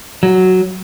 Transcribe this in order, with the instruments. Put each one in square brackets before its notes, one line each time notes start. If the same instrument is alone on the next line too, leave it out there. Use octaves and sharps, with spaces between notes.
[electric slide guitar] F#3